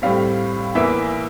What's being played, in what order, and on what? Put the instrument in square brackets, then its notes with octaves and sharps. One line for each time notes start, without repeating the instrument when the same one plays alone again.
[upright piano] A2 G3 C4 F5
E2 E3 A#3 E5